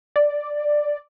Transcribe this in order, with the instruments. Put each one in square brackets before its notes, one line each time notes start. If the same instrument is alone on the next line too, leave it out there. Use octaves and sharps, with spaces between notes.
[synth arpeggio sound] D5